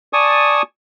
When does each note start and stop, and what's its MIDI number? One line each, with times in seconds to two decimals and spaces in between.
0.13 0.62 74
0.13 0.62 80
0.13 0.62 81
0.13 0.62 85
0.13 0.62 87